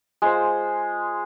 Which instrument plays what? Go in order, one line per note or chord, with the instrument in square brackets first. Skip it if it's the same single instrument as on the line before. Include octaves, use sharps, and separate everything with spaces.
[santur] G#3 F4 C5